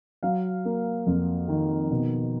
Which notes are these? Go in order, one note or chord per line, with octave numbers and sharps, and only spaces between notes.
F#3 F5
A#3
F2
D#3
B2